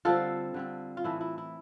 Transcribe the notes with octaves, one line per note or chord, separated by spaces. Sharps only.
D3 G3 C4 F4 A4
D3 G3 C4
F4
A2 E3 A3 E4
E4
E4